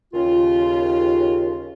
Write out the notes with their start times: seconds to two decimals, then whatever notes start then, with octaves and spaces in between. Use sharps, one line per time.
0.14 D#2 C#3 F4